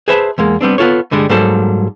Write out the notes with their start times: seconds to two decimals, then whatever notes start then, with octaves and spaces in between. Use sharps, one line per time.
0.08 G#4 B4 C5 E5 A5 B5
0.38 E2 G#3 A#3
0.61 G3 B3 C4 D4
0.78 B3 C4 F4 A4 C#5
1.11 G2 D3 G3 G#3
1.30 G#2 F#3 G3 A#3 A4 C5